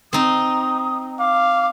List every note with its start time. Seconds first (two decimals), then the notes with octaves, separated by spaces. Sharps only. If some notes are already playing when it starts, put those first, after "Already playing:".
0.13 C4 D#4 D#6
1.19 F5 D6